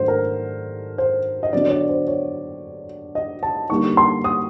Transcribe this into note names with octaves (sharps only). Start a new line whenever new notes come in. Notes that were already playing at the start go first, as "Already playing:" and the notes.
Already playing: G#2 D#3 F#3 A3 D4 C5
A#4
C5
D#5
D3 F#3 B3 D4 D5
C#5
D5
C5
C#5
D#5
A5
D3 G3 A#3 D#4 C#6
C6
D#6